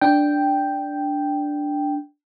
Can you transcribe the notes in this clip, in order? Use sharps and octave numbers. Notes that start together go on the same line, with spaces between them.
D4 G5